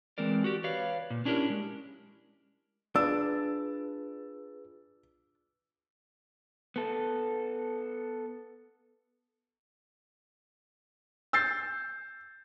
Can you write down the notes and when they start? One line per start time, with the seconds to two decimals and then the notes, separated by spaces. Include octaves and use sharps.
0.18 E3 G#3 C4 A#4 D5
0.44 F#4 G4
0.64 B4 C#5 D5 F5
1.10 A#2
1.25 C#4 D4 E4 G4 A#4
1.50 G#3
2.96 D4 F4 G#4 B4 E6
6.76 B3 A4
11.33 E6 G6 A6 C7